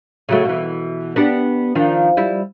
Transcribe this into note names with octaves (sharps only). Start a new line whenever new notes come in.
C#3 F#3 A3
B2 E3
B3 D4 G4
D#3 F3 D4
G3 E4